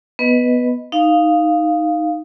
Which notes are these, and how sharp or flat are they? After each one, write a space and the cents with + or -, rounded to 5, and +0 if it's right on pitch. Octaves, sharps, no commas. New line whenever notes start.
B3 +0 B4 +0 D#5 +0
D#4 +0 F5 +0